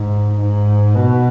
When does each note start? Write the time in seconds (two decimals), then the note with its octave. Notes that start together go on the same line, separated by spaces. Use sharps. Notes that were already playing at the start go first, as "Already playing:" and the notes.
Already playing: G#2
0.39 G#2
0.95 B2